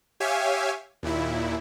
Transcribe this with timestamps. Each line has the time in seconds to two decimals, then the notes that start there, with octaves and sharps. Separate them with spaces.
0.20 G4 C#5 E5 F5 G#5
1.03 D#2 A#2 E4